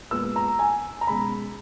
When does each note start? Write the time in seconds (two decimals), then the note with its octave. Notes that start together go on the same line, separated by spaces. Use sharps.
0.11 A#2 G#3 B3 E6
0.36 A#5
0.59 G#5
1.01 A#5
1.07 B2 G#3 C#4 B5